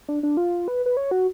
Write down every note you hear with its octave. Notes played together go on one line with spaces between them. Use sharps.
D4
D4
F4
B4
B4
C#5
F#4